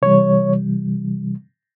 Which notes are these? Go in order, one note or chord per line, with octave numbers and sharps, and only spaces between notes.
C3 E3 G3 C#5